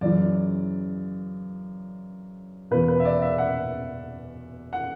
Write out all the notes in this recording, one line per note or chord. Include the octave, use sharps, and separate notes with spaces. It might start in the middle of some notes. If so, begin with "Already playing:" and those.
F#2 C#3 E3 D5
E2 B2 B4
B4
E5
D5
E5
F#5
F#5